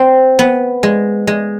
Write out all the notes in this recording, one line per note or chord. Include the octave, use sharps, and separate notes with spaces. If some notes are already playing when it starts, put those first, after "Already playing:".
Already playing: C4
B3
G#3
G#3